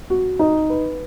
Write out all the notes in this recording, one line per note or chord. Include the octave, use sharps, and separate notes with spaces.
F#4
D#4
B4